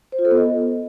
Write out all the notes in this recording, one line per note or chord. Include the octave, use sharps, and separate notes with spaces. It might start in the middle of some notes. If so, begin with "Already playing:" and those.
C5
F4
A4
B3
D#5